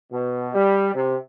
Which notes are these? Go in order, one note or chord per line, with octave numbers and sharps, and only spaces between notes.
B2
G3
C3